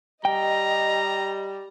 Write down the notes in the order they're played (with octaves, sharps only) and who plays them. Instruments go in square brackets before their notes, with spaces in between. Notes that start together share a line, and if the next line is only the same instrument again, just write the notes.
[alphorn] G3 [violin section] D#5 [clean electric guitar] G5 [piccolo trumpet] A#5